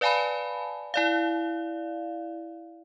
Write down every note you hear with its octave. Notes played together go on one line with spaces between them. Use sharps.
B4 D5 F5 G#5 A5 B5
E4 D5 F5